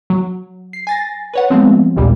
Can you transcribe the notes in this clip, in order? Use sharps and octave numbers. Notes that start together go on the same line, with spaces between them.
F#3
C7
G#5 A6 A#6
B4 C#5 F#5
F3 F#3 G#3 A3 B3 C4
A#1 D#2 A#2 G3